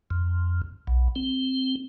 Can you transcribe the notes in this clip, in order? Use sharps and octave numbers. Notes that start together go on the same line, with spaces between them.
F2
B1
C4